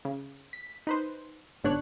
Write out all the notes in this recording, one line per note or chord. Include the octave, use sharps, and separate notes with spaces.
C#3
B6
D#4 B4 C5
G1 G#2 B2 D4 C#5 F#6